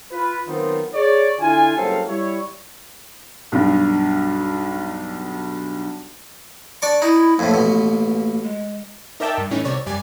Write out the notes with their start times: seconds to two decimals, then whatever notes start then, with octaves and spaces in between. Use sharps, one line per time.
0.12 F4 B4
0.48 D#3 F#3 B3 C4 D#4 F4
0.94 G#4 C#5 D5
1.40 D3 E4 F4 G#5
1.76 F#1 F#3 G3 C4 A4 F5
2.07 G3 E4 C#5
3.52 B1 G2
6.82 D4 D5 C#6
7.02 D#4 E4
7.39 F2 A2 A#3
7.51 A1 B2
8.43 G#3
9.20 D#4 A#4 D5 E5 G5 A5
9.38 G2
9.51 A2 E3 C#4 D#4
9.65 C2 C3 C#5 D5
9.86 F#2 G3 D5 G#5